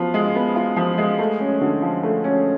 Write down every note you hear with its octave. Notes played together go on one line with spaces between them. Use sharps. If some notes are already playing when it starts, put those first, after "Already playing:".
Already playing: F3 B3 F4
G#3
B3
F4
F3
G#3
A3
C#4
D3
F3
A3
C#4